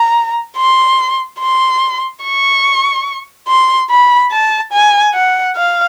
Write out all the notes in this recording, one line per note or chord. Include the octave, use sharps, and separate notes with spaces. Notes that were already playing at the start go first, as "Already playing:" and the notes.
Already playing: A#5
C6
C6
C#6
C6
B5
A5
G#5
F#5
F5